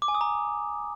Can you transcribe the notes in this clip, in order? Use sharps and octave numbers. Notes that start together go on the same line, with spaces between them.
D6
G#5
D#6
A#5